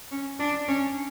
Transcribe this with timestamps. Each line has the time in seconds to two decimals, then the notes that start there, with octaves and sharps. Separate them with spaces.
0.11 C#4
0.39 D4
0.68 C#4